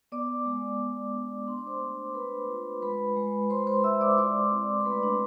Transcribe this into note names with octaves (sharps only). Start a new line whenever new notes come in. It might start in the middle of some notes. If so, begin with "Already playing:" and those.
B3 D5 D6
G#3
G#3
D4
D4 C6
D6
C5 C6
A3
D4 B4 B5
F4
G#3 B4 B5
G#3
G#3 C5 C6
C5 C6
G#3 E5 E6
D5 D6
C6
E4 D5 D6
C4
C6
A3 B4 B5
D4 D5